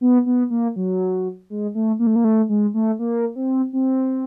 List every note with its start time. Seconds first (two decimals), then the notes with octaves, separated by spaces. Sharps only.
0.01 B3
0.26 B3
0.50 A#3
0.76 F#3
1.50 G#3
1.75 A3
1.99 A#3
2.07 A3
2.16 A#3
2.24 A3
2.49 G#3
2.74 A3
2.99 A#3
3.36 C4
3.73 C4